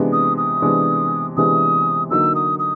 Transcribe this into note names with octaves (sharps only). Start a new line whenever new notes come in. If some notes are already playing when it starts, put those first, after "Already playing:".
Already playing: C3 E3 G#3 B3 D4
D#6
D#6
C3 E3 G#3 B3 D4
C3 E3 G#3 B3 D4 D#6
D3 F#3 A#3 D#4 E6
D#6
D#6